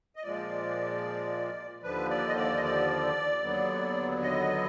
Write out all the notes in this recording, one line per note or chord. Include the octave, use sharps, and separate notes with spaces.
D#5
A#2 F3 G#3 D5
D#2 D3 F3 B4
D5
D#5
D5
D#5
D5
D#2 D3 F#3 B3
D#5